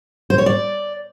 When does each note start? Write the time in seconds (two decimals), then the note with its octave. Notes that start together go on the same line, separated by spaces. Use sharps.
0.30 C5
0.38 C#5
0.46 D5